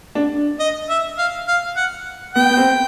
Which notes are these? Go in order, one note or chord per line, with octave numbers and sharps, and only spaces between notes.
D4
D#5
E5
F5
F5
F#5
B3 G5
B3
C4